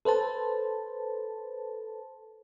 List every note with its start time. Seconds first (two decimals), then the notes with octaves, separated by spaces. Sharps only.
0.05 A4 B4 C5 A5